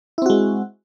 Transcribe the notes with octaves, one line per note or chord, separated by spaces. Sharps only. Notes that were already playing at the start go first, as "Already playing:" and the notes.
G#3 C4 E4 F#4